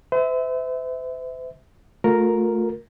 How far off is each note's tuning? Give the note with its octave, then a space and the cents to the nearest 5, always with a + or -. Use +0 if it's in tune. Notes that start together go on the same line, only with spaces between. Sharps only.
C5 -45 E5 -20
A3 +0 F4 +40 A#4 +0